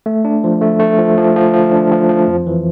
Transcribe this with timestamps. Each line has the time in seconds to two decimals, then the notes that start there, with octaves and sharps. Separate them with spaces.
0.06 A3
0.25 D4
0.44 F3
0.62 A3
0.80 A3
0.98 F3
1.17 F3
1.36 F3
1.54 F3
1.72 D4
1.91 F3
2.09 F3
2.27 F2
2.47 E3